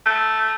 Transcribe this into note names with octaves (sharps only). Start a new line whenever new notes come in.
A3